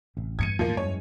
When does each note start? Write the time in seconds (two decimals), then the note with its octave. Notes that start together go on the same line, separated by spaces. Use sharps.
0.17 A1 C3
0.39 E2 G2 G#6 C#7 D#7
0.59 D#2 A2 F3 A#3
0.77 F#2 E3 G#3 C#5